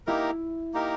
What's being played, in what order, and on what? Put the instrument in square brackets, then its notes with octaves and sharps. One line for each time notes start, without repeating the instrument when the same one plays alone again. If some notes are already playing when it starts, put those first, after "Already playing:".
[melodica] A#3 D#4 G4 A#4 [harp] E4
[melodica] A#3 D#4 G4 A#4